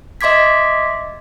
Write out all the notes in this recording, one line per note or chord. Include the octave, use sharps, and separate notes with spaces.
D#5 E5 C6 D6 G#6 B6